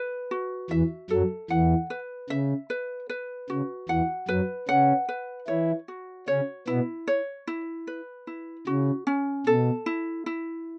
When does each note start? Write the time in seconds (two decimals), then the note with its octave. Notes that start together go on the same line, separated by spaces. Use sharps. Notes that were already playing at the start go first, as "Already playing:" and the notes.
Already playing: B4
0.31 F#4
0.70 E2 E3 E5
1.10 F#2 F#3 A4
1.50 E2 E3 F#5
1.90 B4
2.29 C#3 E5
2.70 B4
3.09 B4
3.49 C#3 F#4
3.89 E2 E3 F#5
4.28 F#2 F#3 B4
4.68 C#3 C#4 F#5
5.09 B4
5.48 E3 E4 C#5
5.88 F#4
6.28 C#3 C#4 C#5
6.67 B2 B3 E4
7.08 C#5
7.47 E4
7.87 B4
8.27 E4
8.67 C#3 F#4
9.07 C#4
9.46 B2 A4
9.86 E4
10.26 E4